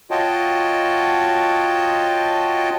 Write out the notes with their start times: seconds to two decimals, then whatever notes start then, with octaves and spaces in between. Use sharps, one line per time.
0.11 F4 F#4 C#5 D#5 G5 A5